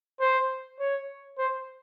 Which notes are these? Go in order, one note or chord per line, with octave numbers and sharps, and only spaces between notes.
C5
C#5
C5